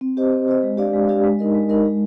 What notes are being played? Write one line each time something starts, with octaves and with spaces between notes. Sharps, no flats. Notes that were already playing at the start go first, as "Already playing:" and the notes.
C4
G4 C5 D#5
C4
G4 C5 D#5
G#3
D4 G4 D5 F5
G#3
D4 G4 D5 F5
G#3
D#4 A#4 D#5
G#3
D#4 A#4 D#5
G#3